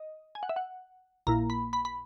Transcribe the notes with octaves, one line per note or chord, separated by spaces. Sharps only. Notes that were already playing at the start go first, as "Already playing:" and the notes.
Already playing: D#5
G#5
F#5
E5
F#5
A#1 A#2 A#3 E4 A#5
B5
B5
B5